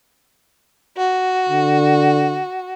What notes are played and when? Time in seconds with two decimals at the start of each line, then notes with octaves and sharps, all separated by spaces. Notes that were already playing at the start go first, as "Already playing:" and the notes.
0.98 F#4
1.49 D3